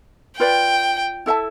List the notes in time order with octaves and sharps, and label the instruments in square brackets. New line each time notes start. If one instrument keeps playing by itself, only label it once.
[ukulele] F4 B4 D5 [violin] G5
[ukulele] E4 A4 E5 A5